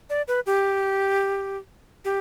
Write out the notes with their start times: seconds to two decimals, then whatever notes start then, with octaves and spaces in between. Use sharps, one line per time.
0.10 D5
0.28 B4
0.46 G4
2.05 G4